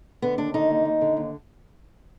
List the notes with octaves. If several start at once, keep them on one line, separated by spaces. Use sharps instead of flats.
D3 B3
D#2 D4
D3 D#4
D#2
D#2
D3
D#2